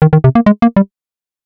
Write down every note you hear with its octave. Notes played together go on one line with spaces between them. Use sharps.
D#3
D#3
C3
A#3
G#3
A#3
G3